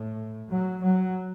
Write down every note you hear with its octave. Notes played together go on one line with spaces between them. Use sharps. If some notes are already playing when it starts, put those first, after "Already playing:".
Already playing: A2
F#3
F#3